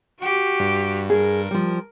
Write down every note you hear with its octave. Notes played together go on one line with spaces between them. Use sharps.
F#4 G4
G2
G#4 A#4
F3 G3